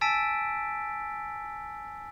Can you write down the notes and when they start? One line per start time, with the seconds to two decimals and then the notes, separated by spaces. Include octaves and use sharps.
0.01 G#5 A5 E6 A6 B6 D7